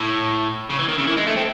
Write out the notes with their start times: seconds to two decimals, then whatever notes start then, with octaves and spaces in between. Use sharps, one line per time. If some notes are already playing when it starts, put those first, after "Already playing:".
Already playing: A2
0.70 C#3
0.78 E3
0.88 D#3
0.98 C#3
1.07 E3
1.17 G#3
1.26 A3
1.36 C4